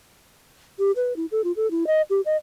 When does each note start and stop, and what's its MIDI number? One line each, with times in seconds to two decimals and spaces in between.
0.79 0.91 67
0.96 1.16 71
1.16 1.26 64
1.32 1.41 69
1.44 1.52 65
1.56 1.69 69
1.71 1.87 64
1.87 2.02 75
2.10 2.21 67
2.26 2.37 75